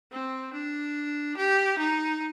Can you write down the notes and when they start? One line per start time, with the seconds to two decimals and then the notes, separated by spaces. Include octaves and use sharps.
0.12 C4
0.53 D4
1.37 G4
1.78 D#4